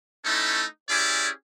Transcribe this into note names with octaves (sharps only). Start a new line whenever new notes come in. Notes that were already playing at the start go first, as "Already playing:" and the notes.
A3 C#4 D#4 E4 A4
C#4 E4 G4 G#4 D5